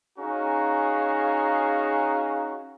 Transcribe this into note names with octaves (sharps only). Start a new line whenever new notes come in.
C#4 D#4 F#4 G#4 F5 A#5